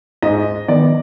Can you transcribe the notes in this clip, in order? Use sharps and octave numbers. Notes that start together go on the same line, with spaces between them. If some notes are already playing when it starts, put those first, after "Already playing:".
G#2 D#5
D#3 B3 D#4 D5